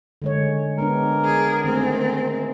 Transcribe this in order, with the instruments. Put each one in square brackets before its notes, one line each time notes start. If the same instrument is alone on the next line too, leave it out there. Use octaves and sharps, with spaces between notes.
[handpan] D3 G#3 C#5
[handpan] G#3 B3 D4 [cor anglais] A#4
[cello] D3 G#4
[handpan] D#3 A3 G#4 [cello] C4